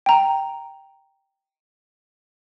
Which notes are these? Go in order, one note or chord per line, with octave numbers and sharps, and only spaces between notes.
G5 A#5